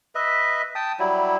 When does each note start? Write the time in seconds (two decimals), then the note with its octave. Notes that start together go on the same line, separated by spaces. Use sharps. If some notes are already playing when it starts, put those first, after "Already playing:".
0.15 B4 D#5 E5
0.75 G5 A5 D#6
0.99 F#3 G3 E4